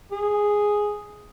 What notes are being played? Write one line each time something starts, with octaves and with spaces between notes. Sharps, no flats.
G#4